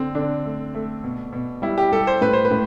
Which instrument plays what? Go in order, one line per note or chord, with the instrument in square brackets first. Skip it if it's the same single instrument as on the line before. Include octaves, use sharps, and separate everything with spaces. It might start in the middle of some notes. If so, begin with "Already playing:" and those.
Already playing: [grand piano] D3 C4
D3 D4
A3
A3
B2
B2
G3 E4
G4
G3 A4
C5
A2 B4
C5
B4
A2